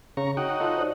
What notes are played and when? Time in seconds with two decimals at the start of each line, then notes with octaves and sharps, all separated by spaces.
0.17 C#3 C#5 A#5 C#6
0.37 D#4 F#4 G5
0.60 F4 A4 D#5
0.78 C5 D5